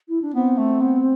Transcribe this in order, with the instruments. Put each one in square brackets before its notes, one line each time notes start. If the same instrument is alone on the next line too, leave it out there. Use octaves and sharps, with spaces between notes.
[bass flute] E4
D4
[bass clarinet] B3 [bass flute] C4
[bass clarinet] A3
B3